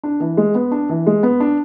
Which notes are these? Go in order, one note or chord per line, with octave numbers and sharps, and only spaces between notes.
D4
E3
G#3
B3
D4
E3
G#3
B3
D4